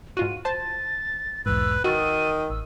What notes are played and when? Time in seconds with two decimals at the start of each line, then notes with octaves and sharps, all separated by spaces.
0.17 G#2 F4 F#4 D#7
0.45 C5 A5 A6
1.46 B1 E2 G#2 B4 E6
1.84 D#3 F#4 D#6 E6 A6 D#7
2.50 A1 E6